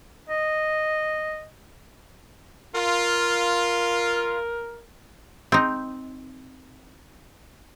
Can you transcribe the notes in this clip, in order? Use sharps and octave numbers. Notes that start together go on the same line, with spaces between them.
D#5
F4 A#4
C4 D#4